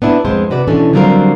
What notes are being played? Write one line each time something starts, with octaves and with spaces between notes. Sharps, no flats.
B3 D4 E4
F2 G#3 B3 C4 C5
C3 F#4 B4 D5
B2 E3 C#4 D4 A4
D3 F#3 G3 C4 F4 A#4